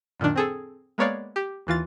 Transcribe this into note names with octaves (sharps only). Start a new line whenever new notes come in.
F#2 A#2 D#3 D4
C4 G#4 A4
G#3 A#3 B3 C#5 D5 F5
G4
D#2 E3 F4 A6